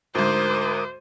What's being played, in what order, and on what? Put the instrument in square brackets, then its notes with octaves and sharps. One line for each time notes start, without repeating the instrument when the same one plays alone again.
[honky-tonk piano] D2 G#2 [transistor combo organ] A#4 D6 D#6 [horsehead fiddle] C5